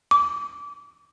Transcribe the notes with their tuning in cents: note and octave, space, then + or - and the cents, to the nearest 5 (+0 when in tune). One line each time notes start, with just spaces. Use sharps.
D6 -25